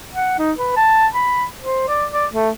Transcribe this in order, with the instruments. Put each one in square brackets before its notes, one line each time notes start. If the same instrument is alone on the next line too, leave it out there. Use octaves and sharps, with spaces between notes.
[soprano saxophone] F#5
D#4
B4
A5
B5
C5
D5
D5
A3